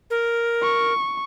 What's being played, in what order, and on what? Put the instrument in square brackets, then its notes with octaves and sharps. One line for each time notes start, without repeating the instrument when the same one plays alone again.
[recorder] A#4
[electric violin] C#6